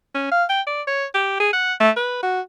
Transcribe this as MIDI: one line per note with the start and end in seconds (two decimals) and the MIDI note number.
0.15 0.28 61
0.31 0.44 77
0.49 0.61 79
0.67 0.82 74
0.87 1.05 73
1.14 1.37 67
1.40 1.50 68
1.53 1.74 78
1.80 1.90 57
1.97 2.20 71
2.23 2.41 66